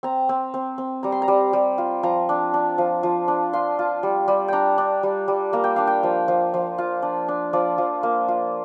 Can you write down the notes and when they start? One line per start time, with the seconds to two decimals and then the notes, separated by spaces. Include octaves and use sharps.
0.03 C4 A#5
0.29 C4
0.54 C4
0.78 C4
1.03 G3 A#5
1.12 C6
1.22 A#5
1.28 G3
1.53 G3
1.78 F4
2.03 F3 A#5
2.29 D4
2.54 D4
2.78 F3
3.03 F3
3.28 D4
3.53 F4 C6
3.79 F4
4.03 G3
4.28 G3
4.48 D4 G5 A#5
4.78 D4
5.03 G3
5.28 G3
5.53 A#3 A#5
5.64 G5
5.76 D4 F5
5.87 G5
6.03 F3
6.28 F3
6.54 F3
6.78 F4
7.02 D4
7.28 D4
7.53 F3 D5
7.78 F3
8.03 A#3
8.28 F4